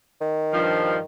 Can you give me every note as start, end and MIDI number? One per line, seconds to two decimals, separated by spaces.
0.21 1.04 51
0.53 0.97 43
0.53 0.97 53